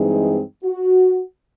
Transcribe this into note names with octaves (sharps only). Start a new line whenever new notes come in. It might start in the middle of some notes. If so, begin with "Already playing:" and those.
Already playing: G2 E3 G#3 C4 D#4 G#4
F#4